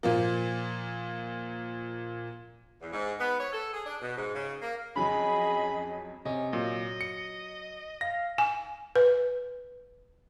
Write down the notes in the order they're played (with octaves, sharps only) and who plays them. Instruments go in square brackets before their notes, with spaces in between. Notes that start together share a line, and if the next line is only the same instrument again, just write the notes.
[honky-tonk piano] A#2 F3 A#3
[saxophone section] E2
G#2
B3
C#5
A4
G#4
D4
B2
G#2
C#3
A#3
[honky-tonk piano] F2 F#3 C#4 [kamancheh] G#4 D#5 [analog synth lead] B5
[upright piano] C3 D#5 [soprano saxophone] C#4
[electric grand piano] A#2 [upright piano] F#3 [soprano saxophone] D#5
[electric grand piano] C#7
[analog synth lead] F5 [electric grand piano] A#6
[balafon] G#5
B4